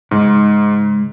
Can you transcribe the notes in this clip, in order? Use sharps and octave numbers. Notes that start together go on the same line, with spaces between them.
G#2 C#3 G#3